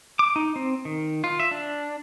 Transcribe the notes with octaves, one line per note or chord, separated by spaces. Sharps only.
D6
D#4
C4
D#3
F4
E5
D4